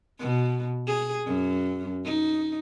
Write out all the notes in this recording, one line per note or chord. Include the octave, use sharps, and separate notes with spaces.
B2
G#4
F#2
D#4